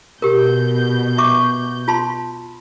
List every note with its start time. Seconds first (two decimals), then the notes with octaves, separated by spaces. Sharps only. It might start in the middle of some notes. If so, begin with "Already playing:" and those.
0.22 B2 G4 A#4 G6
1.18 E5 C#6 D6
1.88 F4 A5 C6